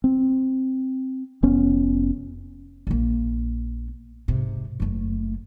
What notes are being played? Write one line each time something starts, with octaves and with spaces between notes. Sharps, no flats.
C4
F1 B3 C#4
A#1 A#3
G#2 C3
F#1 A3